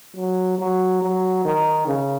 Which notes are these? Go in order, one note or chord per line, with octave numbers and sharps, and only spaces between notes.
F#3
F#3
F#3
D#3
C#3